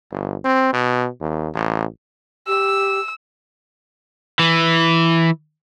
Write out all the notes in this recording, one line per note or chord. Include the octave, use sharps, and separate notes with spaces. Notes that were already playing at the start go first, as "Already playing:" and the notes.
G1
C4
B2
D#2
A1
G4 E6
E3